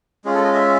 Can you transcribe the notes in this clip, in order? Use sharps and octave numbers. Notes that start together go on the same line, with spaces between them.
G#3 C#4 F4 G#4
A4
D#5
E5